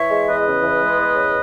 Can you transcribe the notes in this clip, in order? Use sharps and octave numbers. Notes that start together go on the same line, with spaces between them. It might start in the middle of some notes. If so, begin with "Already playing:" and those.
Already playing: E3 C#5 E5
G#3
E2 B4 D#5
C#3
E3
G#3
E2
C#3